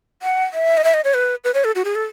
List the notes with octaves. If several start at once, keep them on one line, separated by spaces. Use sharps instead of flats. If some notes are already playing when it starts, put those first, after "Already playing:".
F#5
E5
D#5
E5
D#5
C#5
B4
B4
C#5
A4
F#4
G#4
A4